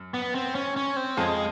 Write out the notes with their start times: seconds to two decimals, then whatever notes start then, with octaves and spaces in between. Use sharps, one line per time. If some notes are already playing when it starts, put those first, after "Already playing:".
Already playing: F#2
0.14 B3
0.35 C4
0.55 C#4
0.76 C#4
0.96 C4
1.17 F2 G#3